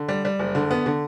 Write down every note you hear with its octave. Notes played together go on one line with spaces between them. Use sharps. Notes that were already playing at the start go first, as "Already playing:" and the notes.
Already playing: D3
G3
G3
F#1
D3
B3
D3